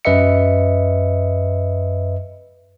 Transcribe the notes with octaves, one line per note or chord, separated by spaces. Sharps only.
F#2 B4 D#5 E5 C#7